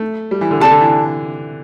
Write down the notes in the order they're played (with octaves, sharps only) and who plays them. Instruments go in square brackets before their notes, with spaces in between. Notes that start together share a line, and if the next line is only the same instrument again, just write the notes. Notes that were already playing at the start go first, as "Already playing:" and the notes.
Already playing: [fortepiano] A3
G3
E3
D3
[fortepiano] C3 [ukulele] A4 D5 A5
[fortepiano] D3
E3